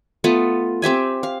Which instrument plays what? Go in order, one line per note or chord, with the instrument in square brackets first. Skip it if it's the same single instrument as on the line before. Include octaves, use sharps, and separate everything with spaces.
[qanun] A3 B3 F4
C4 G4 E5 G#5
F5